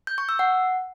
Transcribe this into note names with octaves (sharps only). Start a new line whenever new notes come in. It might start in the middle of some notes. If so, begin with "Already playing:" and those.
G6
C#6
E6
F#5